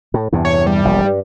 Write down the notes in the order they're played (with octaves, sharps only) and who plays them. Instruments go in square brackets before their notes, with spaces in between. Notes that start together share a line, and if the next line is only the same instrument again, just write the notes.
[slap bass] A2
E2 G2 C3
[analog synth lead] C#5
G3
[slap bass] E1 A#1
G2